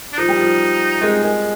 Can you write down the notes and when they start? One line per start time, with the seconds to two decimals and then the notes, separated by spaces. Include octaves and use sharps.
0.13 D4
0.18 F3 D#4
0.29 G3
0.40 F3
1.01 G#3
1.22 G#3